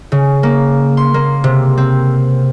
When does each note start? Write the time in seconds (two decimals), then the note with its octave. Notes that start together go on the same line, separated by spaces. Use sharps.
0.12 C#3
0.43 A#3
0.97 C6
1.14 A#3
1.44 C3
1.78 C4